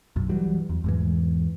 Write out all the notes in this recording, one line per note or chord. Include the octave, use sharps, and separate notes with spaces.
B1 F#2
E3 F#3 G3
E2
E2 G#2 E3